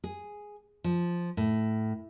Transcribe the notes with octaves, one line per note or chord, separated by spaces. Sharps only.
G#4
F3
A2